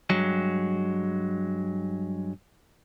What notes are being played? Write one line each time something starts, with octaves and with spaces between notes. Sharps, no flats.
G2 F#3 G#3